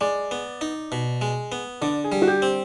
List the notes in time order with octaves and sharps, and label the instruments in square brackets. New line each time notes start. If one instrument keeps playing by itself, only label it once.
[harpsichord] G#3 [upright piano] D5
[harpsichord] B3
D#4
B2
G#3
B3
[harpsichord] D3 [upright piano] D5
[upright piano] G#4
[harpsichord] G3
[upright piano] F#4
G4
[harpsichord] C4